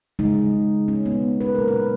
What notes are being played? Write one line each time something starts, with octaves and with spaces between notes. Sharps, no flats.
C#3 G#3 D#4
C#4
B3
B4
A#2 F#3 A#3 A#4
B4